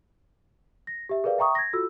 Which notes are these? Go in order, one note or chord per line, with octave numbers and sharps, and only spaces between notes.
A#6
G4 E5
G#4 A#4 B4 D5 F5
E5 G5 A#5 C#6 D#6
G#6 A#6
F4 F#4 A4 E6